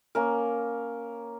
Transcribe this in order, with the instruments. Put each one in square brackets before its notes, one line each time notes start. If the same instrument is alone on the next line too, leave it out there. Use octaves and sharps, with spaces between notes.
[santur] A#3 C#4 A#4